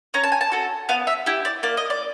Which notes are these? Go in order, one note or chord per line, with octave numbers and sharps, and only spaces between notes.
C#4 A#5
A5
G#5
A5
F#4 A4
B3 F5
E5
E4 G4
D5
A#3 D5
D#5
D5